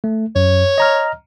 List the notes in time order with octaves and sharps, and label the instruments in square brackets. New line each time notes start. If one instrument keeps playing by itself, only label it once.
[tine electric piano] A3
[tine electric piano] F#2 [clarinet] C#5
[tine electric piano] D#5 A#5 F6